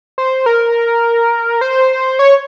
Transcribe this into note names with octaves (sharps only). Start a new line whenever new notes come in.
C5
A#4
C5
C#5